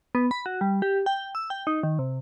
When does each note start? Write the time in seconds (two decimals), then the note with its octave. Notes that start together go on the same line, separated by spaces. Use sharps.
0.15 B3
0.31 B5
0.46 F#4
0.61 G3
0.82 G4
1.06 G5
1.35 E6
1.50 G5
1.67 D#4
1.83 D#3
1.99 C3